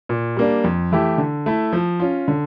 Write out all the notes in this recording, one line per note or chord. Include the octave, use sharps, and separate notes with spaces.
A#2
G3 A#3 D4
F2
E3 A3 E4 G4
D3
A3 E4
F3
C#4 F4
D3